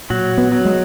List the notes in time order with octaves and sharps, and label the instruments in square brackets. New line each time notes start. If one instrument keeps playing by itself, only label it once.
[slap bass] A#2 [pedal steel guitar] F#3 F#4
[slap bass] B3
[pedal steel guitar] F#3 F#4
[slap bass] G#3